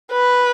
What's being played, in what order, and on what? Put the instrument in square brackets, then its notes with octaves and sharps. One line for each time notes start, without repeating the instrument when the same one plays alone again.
[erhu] B4